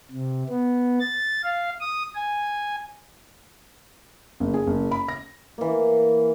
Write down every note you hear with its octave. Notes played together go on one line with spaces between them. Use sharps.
C3
B3
A6
F5
D#6
G#5
F#1
G#4
F#1
B5
A#6
E3 A#3